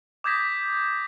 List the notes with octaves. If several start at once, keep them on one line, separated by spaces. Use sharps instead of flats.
D6 D#6 G6 G#6 A#6 B6